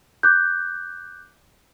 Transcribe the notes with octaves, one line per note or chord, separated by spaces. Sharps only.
D6 F#6 G6